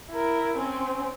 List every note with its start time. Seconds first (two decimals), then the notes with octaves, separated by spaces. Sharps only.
0.10 E4 A#4
0.57 C4 C#4